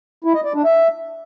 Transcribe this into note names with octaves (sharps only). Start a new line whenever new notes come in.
E4
D#5
D5
D4
E5